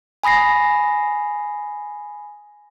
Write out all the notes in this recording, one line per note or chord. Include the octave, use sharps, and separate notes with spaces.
G#5 B5 D#6 A#6 C7